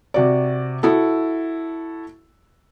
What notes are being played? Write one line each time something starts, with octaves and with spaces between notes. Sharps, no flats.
C3 F#4 D5
E4 F#4 A4